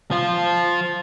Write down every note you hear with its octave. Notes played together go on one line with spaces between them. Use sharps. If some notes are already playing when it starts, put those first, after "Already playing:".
F3 F4